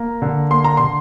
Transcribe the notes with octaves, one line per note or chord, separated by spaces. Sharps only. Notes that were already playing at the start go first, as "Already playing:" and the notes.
Already playing: A#3 A#5
D3
A#3 C6
A#5
D3 C6